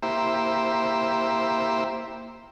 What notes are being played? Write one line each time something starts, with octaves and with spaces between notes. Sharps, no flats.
A#3 E4 G4 C5 E5